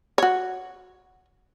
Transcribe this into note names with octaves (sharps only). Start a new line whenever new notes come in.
F#4 C#5